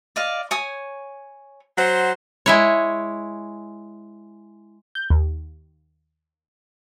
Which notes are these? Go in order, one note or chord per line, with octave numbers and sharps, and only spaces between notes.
D5 D#5 F5
C#5 G#5 D#6
F#3 C5 F#5
G#3 E4 C#5
G6
D#2